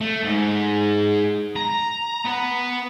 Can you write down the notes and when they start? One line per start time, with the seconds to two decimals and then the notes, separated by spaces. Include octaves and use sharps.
0.01 A3
0.24 G#2
1.56 A#5
2.25 B3